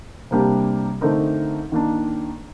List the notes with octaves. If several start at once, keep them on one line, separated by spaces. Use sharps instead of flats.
C3 G3 A#3 D4 G4
D3 A3 C4 D#4 A#4
D#3 A#3 D4